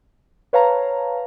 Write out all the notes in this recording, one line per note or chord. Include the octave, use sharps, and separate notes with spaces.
B4 C#5 F5 A5 A#5